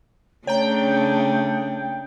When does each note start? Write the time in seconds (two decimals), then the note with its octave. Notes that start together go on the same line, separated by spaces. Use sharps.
0.47 C#3 A3 D4 C#5 G5 A#5